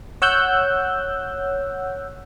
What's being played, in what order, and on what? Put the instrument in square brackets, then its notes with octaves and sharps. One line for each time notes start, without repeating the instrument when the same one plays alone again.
[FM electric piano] C#5 F#5 E6 F#6 G6